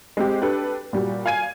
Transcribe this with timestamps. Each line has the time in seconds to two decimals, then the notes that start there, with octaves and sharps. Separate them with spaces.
0.17 G#3 C4 G4
0.42 D4 G4 A4 B4
0.93 A#2 G3 F#4
1.26 F5 G#5 G#6 D#7